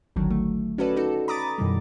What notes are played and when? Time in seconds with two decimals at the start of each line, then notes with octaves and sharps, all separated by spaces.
0.16 G#1 D2 D3 D#3 F#3
0.30 A3
0.78 C#4 F#4 A4 B4 D5
0.96 D#4 F#4 A4
1.28 A#5 B5 D6 D#6 A6
1.58 F#2 B2 D#3 E3 G3